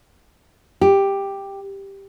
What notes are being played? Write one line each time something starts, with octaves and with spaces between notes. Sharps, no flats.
G4